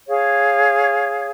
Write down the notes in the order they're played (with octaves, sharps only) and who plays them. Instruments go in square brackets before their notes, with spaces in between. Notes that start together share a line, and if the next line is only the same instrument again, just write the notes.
[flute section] G#4 C#5 F5